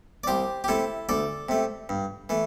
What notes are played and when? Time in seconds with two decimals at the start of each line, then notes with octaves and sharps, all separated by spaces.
0.24 D5
0.27 C2 G4 C5
0.64 G4
0.68 C3 A3 E4 A4
1.09 D2 A4 D5
1.49 C3 A3
1.89 G2
2.29 E3 A3